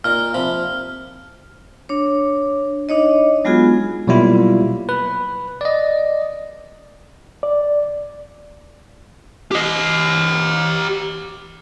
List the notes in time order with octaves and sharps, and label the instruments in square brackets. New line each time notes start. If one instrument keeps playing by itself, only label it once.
[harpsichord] A#2 D#4 [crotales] F6
[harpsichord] C3 F3 B5
[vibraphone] D4 C#5
D4 D#4 C#5 D#5
F#3 G#3 B3 F4 F#4 G#4
[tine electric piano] B2 F#3 G3 A#3 E4 F4
B4
D5 D#5
[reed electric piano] D5
[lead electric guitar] G4 D#5